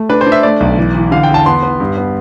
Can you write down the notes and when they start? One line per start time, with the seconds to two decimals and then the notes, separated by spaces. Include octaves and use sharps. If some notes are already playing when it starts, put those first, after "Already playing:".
Already playing: A3
0.09 D4 B4
0.21 C5
0.26 D4
0.32 E5
0.43 A3 D5
0.60 B1
0.78 E3
0.95 E3
1.11 D3 F5
1.23 G5
1.29 E2 A5
1.46 B3 C6
1.63 B3
1.80 G2
1.97 B3